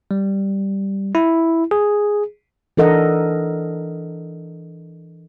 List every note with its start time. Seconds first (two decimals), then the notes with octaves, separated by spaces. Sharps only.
0.11 G3
1.15 E4
1.71 G#4
2.77 E3 D4 A4 A#4 D#5 F#5